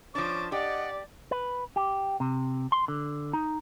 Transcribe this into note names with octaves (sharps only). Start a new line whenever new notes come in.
F3 C#4 D4 D6 A6
G4 D5 D#5 F#5
B4
G4
C3
C6
D3
D#4